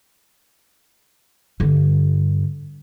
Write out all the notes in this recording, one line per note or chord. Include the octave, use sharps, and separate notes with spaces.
G2 D3